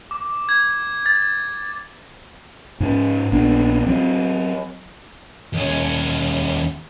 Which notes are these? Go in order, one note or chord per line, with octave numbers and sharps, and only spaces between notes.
D6
G#6
A6
G#2 C#4
A#1 B3 D4
F#3 C4
D#2 C#4